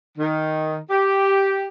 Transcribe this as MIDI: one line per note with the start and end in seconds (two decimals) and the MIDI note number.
0.18 0.75 51
0.88 1.64 67